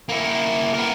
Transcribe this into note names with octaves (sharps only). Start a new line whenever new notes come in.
A#3 E4
B3 A#4